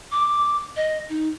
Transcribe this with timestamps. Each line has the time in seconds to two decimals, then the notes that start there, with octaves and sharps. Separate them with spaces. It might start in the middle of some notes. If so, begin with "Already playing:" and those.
0.12 D6
0.76 D#5
1.09 D#4